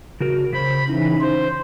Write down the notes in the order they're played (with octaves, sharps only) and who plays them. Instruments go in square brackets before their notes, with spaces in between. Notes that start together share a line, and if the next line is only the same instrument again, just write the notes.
[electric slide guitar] C#3 F#4 A#4
[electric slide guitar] C#3 C5 [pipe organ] B5
[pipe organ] C#3 E3 [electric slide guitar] D#4
[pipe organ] C5